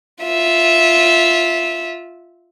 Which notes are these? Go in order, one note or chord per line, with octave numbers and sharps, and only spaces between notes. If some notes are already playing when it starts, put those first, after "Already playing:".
F4 E5